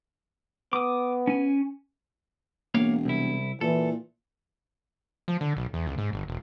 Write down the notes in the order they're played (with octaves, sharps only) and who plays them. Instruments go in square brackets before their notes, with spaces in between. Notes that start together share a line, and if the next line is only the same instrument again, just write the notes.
[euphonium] B3 [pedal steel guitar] D6 D#6
[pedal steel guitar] C#4 G#5
[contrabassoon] E1 [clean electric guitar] A#3 C#5 F5
[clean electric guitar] C2 E4
[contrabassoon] A#2 [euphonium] E3 [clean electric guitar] A4
[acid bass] F3
D3
B1
E2
C#2
G#2
G1
E1